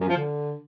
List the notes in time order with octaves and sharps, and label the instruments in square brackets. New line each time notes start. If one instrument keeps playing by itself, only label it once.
[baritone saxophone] F#2
F3
D3